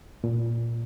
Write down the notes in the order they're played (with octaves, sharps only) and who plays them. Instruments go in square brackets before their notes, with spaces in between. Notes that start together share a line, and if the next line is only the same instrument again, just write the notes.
[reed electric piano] A#2